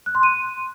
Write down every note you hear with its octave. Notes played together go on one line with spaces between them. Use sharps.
F#6
C6
D#7